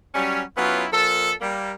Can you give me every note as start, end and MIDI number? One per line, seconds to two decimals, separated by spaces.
0.14 0.42 54
0.14 0.42 55
0.14 0.42 61
0.56 0.85 54
0.56 0.85 59
0.56 0.85 61
0.56 0.85 64
0.56 0.85 65
0.92 1.31 46
0.92 1.31 53
0.92 1.31 69
1.40 1.71 55
1.40 1.71 58